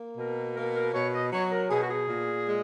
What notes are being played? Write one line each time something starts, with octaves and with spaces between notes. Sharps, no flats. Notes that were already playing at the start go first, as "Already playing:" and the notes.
Already playing: A#3
B2 A#4
A#3 A#4
A#4
B2 C#5
D#5
F#3 C#5
A#4
B2 G#4
F#4
G#4
A#2
G#3